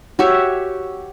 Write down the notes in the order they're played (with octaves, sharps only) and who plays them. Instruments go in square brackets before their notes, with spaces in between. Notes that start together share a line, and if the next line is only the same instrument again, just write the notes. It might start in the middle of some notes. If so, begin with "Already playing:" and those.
[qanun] F#4 G4 C#5 E5